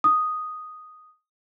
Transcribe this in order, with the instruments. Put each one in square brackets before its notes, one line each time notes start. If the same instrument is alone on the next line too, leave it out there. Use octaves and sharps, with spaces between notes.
[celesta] D#6